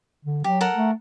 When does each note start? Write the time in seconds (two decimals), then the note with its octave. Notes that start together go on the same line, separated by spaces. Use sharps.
0.25 D3
0.44 F#3 G4
0.61 A4 A#4 F#5
0.75 A3